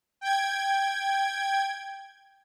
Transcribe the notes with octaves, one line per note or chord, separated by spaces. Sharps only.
G5 G#6